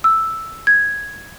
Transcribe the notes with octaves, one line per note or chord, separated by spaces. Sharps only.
E6
G#6